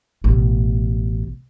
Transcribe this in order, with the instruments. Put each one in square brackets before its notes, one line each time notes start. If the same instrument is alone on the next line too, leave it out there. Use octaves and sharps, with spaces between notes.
[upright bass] A1 B2